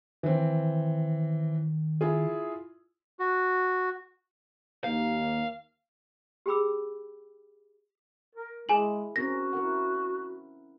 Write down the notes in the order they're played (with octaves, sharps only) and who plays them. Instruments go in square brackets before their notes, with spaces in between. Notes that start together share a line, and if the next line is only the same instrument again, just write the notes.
[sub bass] D#3 [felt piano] E3 C4
[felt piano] E4 F4 G#4
[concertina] F#4
[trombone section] D#2 A#3 [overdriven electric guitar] F5
[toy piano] G4 G#4 G5 B5 D6 E6
[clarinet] A#4
[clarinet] G#3 [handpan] E4 [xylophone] G#4 G#5 F#7
[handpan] C4 C#4 A#4 [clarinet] F#4 [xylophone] A#6
[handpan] E4 A#4 F#5